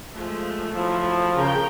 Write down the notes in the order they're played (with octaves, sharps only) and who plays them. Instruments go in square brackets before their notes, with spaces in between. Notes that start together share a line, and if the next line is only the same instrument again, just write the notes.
[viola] F3 G#3 [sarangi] A3
[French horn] F3 [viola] F#3 E4
[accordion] C#3 [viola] C#4 G5 [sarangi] A#4